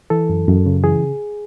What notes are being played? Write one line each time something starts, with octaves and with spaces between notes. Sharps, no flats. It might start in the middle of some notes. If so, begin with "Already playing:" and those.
E3 A4
F#2
F#2
C#3
E3 G#4